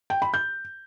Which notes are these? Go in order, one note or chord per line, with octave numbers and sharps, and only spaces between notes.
G5
B5
G6